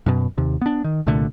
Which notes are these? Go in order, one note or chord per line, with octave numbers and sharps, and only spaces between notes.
F#2 B2
D#2 C3
B3 D4
D#3
C2 A#2 D3 A3